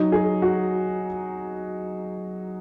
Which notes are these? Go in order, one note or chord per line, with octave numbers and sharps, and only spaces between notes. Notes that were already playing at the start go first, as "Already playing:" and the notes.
Already playing: F#3 D#4
G#4
F#4